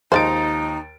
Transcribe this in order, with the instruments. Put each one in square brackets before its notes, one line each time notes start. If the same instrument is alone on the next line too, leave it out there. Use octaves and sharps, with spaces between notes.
[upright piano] D#2 A6 D7 [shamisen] F3 G#3 C5 [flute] D#4